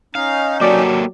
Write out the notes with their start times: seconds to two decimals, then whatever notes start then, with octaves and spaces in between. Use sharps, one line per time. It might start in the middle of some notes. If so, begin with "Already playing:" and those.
0.15 C#4 D#4 F5
0.61 F#3 A#3 G4 A4 D5